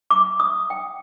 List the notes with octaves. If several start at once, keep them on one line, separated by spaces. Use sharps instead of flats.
D6
D#6
G5